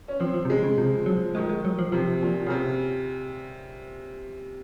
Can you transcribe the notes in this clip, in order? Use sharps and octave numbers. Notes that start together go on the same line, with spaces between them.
C#4
F3 C4
F3
C3
C#3 G#3
C#3
C3 F3
F3 F#3
D#3 G#3
G#3
F#3
F3
C3 F3
A#2
C#3
C3